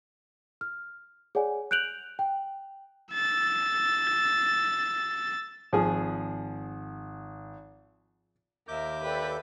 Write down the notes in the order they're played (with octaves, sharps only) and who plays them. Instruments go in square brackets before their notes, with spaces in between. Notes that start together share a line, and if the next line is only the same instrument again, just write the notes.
[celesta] F6
G#4 C#5 D5 F#5 G#5
F#6 G6 D7 F7 F#7
G5
[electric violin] E6 A6
[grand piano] G#1 [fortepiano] F3 G#4
[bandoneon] D#2 D6 G6 [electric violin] A#4 [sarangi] E5
[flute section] G4 A4 D5 [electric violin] B4